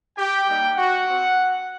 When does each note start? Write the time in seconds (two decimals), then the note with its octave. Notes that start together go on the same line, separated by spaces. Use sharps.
0.17 G4 G5
0.46 G3 A#3 D#4 G4
0.76 F#4 F#5
1.05 C4 F#4